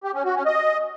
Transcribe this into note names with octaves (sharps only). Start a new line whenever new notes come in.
G4
C#4
F#4
C#4
D#5